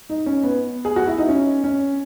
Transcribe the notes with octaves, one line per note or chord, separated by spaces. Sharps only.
D#4
C#4
B3
G#4
F#4
E4
D#4
C#4
C#4